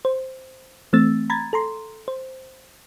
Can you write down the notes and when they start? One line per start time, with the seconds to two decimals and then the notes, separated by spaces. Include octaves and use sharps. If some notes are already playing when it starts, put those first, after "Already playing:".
0.05 C5
0.93 E3 A3 C4 E6 A6
1.30 A#5 B5 G#6 A6
1.53 A4 A#5 C6
2.08 C5